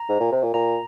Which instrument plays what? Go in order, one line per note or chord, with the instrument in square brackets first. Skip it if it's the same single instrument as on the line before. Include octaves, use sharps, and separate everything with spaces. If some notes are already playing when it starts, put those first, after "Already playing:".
Already playing: [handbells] A#5
[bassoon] G#2
A#2
C3
A#2
[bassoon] A#2 [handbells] A#5